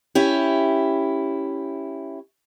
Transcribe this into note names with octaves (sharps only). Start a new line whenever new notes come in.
C#4 E4 G4